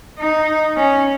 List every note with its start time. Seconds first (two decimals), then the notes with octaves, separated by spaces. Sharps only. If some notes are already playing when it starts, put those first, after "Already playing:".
0.19 D#4
0.76 C#4